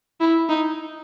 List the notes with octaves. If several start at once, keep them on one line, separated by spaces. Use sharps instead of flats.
E4
D#4